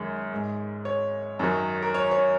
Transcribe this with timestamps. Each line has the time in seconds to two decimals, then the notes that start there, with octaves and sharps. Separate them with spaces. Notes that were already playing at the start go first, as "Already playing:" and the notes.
Already playing: F#2 D#3 G#3
0.32 G#2 G#3
0.85 C#5
1.39 F#2 D#3 F#3
1.82 A#4
1.94 C#5
2.11 C#5